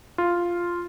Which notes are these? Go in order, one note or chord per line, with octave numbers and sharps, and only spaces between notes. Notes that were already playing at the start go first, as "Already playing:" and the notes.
F4